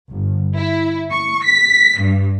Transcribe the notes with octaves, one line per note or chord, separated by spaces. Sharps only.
G1
E4
C#6
B6
G2